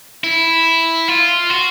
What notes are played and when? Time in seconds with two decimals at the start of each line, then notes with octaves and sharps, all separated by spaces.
0.24 E4
1.08 F4
1.50 F#4